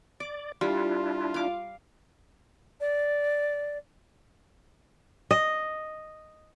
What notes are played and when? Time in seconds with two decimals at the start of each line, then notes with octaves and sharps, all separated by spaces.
0.20 D5 D6
0.61 G3 D4 E4 F4
1.34 F5 D6
2.80 D5
5.31 D#5